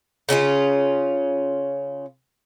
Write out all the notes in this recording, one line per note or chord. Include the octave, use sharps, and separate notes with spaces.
C#3 C#4 E4 F4